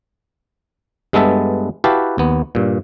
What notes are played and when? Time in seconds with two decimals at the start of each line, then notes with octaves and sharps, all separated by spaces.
1.13 G2 G#3 B3 A4 E5 A5
1.84 E4 F#4 G4 B4 F5 A5
2.18 D#2 B3
2.55 G2 A#2